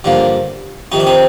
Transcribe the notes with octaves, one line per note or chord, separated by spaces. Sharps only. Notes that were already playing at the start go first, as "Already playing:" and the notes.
G2 D3 F3 A#3
F2 C3 D#3 D#4
D4
C4 D#4